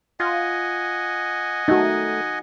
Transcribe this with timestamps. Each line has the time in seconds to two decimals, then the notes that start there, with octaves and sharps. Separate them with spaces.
0.20 F4 D#5 F#5 G#5
1.68 A3 D#4 F#4